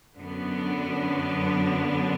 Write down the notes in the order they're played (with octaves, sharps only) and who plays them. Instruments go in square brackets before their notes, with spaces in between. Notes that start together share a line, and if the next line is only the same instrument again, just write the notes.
[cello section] F#2 D3 F#3 B3 D4